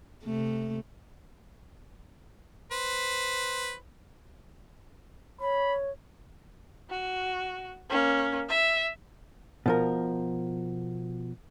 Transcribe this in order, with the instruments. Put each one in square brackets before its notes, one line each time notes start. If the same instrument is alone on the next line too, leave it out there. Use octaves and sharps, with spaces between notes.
[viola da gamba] C3 A3
[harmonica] B4 C5
[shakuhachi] C#5 [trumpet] B5
[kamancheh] F#4
A#3 C#4
E5
[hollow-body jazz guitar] B2 F3 A#4